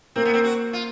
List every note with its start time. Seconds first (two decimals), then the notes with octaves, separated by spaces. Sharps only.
0.16 A#3 C4
0.25 B3
0.33 C4
0.44 F#4
0.73 F4